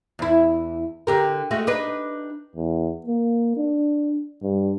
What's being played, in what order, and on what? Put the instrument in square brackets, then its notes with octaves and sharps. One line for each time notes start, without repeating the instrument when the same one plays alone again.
[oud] E2 E4
D3 G4 A#4
G#3 A3 F#4
D4 D#4 B4
[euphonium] E2
A#3
D4
G2